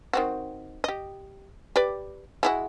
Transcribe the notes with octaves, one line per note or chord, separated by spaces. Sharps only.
D#3 C4 F#4
G4 D#5
G4 B4 D5
G#3 E4 F#4